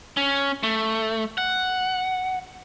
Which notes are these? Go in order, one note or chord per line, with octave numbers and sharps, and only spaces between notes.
C#4
A3
F#5